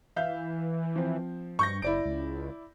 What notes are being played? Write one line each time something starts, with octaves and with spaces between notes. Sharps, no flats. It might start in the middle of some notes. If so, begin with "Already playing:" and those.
E3 E5 F5 G6
F3 C4
G2 C#6 G6 A#6
F#1 E4 D5 D7
C#2